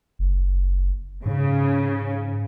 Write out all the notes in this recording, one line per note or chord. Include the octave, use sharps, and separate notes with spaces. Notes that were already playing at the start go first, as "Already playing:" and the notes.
F#1
G#2 C#3